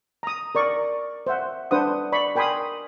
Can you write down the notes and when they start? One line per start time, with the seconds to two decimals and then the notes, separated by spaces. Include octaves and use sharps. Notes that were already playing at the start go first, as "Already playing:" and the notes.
0.23 A#5 D#6
0.55 A#4 D5 C#6
1.27 C5 E5 F#5
1.71 D4 B4 C5 F#5 D#6
2.12 D5 B5 C#6
2.35 A#4 G5 G#5 B5 C6 D#6